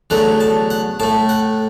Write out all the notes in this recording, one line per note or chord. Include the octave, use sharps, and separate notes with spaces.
E2 D3 F#3 A3 F#5
A5
F#5
A2 A3 A5
F#5